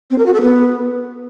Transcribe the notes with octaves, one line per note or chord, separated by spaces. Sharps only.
C4
A#4
F#4
A4
B3